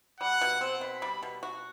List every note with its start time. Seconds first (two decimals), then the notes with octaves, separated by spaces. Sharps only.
0.20 G3 F#5
0.41 B2
0.61 C4
0.81 B2 B5
1.02 G3
1.23 B2
1.43 F#4